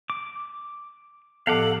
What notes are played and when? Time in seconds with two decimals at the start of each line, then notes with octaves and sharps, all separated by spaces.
0.10 D6
1.47 A2 F3 B3 A4 F5 F#5 D6